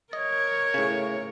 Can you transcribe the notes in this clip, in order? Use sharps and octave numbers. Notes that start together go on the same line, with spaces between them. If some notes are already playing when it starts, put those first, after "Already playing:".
A#4 C#5 D#5 G#6
A2 C#3